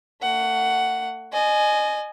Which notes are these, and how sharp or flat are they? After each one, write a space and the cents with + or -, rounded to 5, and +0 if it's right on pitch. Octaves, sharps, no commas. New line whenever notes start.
A3 +35 F#5 +10
D#5 -25 G#5 +15